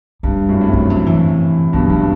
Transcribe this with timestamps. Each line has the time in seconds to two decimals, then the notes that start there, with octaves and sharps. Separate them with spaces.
0.23 G2 G3
0.49 F#2 A2
0.61 A2 C3
0.73 G3
0.90 F#3
1.06 E3
1.73 G2 B2 F#3
1.89 G2 B3